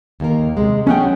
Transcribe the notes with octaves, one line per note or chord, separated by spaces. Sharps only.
D#2 A#3 A#4
C3 G#3
F#3 A3 C#4 G#4 F#5 G5